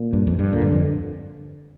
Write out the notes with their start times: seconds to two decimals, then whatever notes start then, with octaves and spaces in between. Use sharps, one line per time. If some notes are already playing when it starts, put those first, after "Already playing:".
Already playing: A#2
0.13 G2
0.27 F2
0.39 G2
0.53 A#2 D3
0.61 G2
0.72 F2